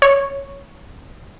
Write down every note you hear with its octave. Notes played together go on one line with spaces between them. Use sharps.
C#5